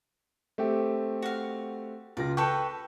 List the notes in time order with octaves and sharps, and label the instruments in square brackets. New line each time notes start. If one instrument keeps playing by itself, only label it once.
[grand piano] A3 C4 G4
[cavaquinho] F#4 F5
[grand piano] C#2 F4 A#6 [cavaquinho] D5
[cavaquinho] A4 B4 G5 [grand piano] C#6